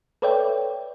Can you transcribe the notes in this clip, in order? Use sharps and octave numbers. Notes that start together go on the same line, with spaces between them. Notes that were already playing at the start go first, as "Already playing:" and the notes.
A4 B4 C#5 D5 E5 G5